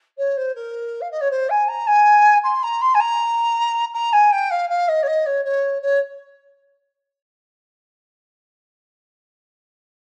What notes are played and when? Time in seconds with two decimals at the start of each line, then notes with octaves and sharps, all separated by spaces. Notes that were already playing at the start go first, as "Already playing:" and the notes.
0.17 C#5
0.37 C5
0.55 A#4
1.01 F5
1.11 D#5
1.21 C#5
1.30 C5
1.49 G#5
1.68 A#5
1.87 G#5
2.43 C6
2.63 A#5
2.81 C6
2.94 G#5
3.00 A#5
3.94 A#5
4.13 G#5
4.31 G5
4.50 F5
4.69 F5
4.88 D#5
5.02 C#5
5.07 D#5
5.26 C#5
5.44 C#5
5.82 C#5